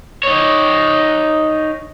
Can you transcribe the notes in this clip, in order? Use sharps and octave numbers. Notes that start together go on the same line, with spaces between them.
D#4 C#5